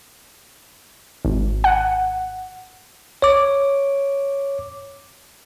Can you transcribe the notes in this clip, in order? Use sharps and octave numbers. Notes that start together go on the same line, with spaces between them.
G#1
F#5
C#5 D6